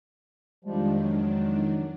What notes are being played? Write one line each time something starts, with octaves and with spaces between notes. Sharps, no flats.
F2 D#3 F3 G3 G#3 D4
F#3